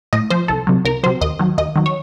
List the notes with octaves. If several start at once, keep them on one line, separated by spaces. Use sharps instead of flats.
A2 D#5
F3 C5
C2 A4
C3 F#3
C2 A#4
C3 F#3 C5
D#2 D#5
D#3 F#3
D#2 D#5
D#3 F#3
C#5